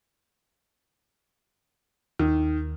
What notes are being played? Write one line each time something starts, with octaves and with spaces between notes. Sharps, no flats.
D#2 D#3